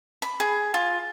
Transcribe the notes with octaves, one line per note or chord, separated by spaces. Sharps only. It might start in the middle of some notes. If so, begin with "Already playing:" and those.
B5
G#4
F4